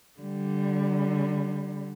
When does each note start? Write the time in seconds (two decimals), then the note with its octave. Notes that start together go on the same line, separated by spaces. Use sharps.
0.20 D3 G3